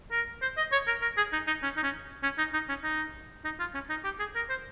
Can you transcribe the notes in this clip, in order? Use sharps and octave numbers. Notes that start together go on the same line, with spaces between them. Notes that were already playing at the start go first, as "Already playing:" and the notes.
A#4
C5
D#5
C#5
A#4
A#4
G#4
D#4
D#4
C#4
D#4
C#4
C#4
D#4
D#4
C#4
D#4
D#4
F4
C#4
D#4
G4
G#4
A#4
C5